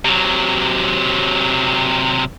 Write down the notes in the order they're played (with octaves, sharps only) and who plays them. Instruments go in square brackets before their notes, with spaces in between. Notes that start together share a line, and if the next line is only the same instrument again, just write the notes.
[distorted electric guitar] C3 F#3